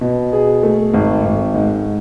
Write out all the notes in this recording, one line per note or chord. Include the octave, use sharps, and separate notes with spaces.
B2
G#4
A3
G#1
G#1
G#2